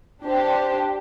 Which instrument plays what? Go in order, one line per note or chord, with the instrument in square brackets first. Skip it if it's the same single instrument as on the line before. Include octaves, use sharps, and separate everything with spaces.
[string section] D4 G4 C5